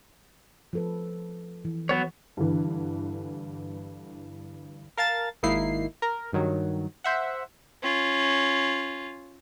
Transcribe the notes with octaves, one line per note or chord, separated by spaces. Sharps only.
F3 A4 B4
E3
F#3 B3 C#5
G2 D3 E3
A#4 F5 A5 A6
G#1 A#3 D#4 E4 C7
A#4
G2 D#3 F#3
C5 E5 F#5
C#4 F4